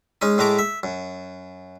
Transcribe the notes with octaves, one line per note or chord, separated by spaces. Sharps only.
G#3 C#4 D#4
A2 G#3 A3 A#5 D6
E5
F#2